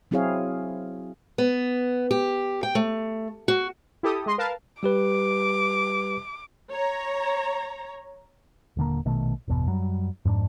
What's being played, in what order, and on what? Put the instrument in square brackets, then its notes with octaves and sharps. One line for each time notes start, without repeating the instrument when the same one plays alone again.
[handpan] F#3 C4 E4 G#4 C#5 F5
[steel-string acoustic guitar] B3
G4
G5
A3
F#4
[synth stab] E4 G4 A4 D#6
G#3 D#5 C6
A#4 B4 F5 A5
[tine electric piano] G3 G4 B4 [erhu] D6
[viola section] C#5 A#5
[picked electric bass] D#1 D3 A#3
A#1 B2 D#3 A3
G1 E2 B2
F#2 F#3 G3
F2 G#2 G3 D4